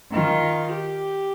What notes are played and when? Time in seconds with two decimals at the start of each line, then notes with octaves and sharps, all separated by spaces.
0.12 D#3 F4
0.70 G4